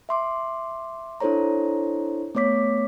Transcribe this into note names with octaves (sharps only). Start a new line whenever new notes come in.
E5 C6 D6
D4 E4 A4 C5 C#5 A#5
A3 B3 C#5 D6 B6